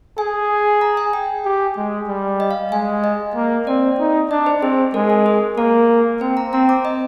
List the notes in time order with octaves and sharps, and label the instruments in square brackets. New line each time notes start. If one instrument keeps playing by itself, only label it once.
[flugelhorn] G#4 [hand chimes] G#5
[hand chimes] A#5
G#5
G5
[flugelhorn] G4
G#3
G3
[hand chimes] D#5
F5
[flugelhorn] G#3 [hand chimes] G#5
[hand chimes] D#5
[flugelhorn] A#3
[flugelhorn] C4 [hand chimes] D5
[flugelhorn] D#4
[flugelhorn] D4 [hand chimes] D#5
[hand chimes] C5
[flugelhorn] C4 [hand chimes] G#4
[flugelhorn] G#3 [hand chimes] A#4
[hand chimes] A#4
G#4
[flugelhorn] A#3 [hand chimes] A#4
[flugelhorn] C4 [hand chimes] C5
[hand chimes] A#5
[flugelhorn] C4 [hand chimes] A#5
[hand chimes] D6
D#5